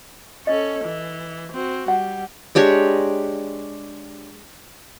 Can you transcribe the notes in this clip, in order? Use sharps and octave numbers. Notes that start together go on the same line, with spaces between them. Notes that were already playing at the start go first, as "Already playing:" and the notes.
C#4 A4 D#5
E3
C4 F#4
G3 F#5
G#3 D4 G4 C#5